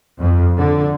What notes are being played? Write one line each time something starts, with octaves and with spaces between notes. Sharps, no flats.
F2
D3